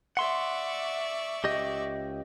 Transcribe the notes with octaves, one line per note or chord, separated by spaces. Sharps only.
D5 E5 F#5 C6 C#6
C#2 G4 D#5